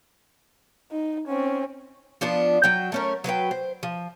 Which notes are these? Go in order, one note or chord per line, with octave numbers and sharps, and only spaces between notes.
D#4
C4 C#4
F3 B3 D4 F4
F#3 G5
A3 C#4 A#4
F#3 B4 C5 G5
C5
F3